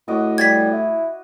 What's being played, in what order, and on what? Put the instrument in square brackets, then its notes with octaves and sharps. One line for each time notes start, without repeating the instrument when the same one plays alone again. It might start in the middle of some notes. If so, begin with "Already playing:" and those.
[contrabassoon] A2 [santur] F#4 D#5 D6
[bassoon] G3 [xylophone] G#6 A6 B6
[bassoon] E4